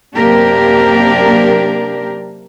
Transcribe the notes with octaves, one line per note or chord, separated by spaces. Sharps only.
F#2 C3 A#3 D4 G4 A#4